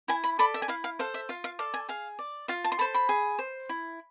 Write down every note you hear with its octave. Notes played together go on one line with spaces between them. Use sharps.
E4 G#5
B5
A4 D5 B5
E5
G#5
E4 F5
F5
A4 C5 F5
E5
F4 F5
F5
A4 D5 F5
G#5
G#4 F5
D5
F4 F5
A5
C6
A4 C5 B5
B5
G#4
C5
E4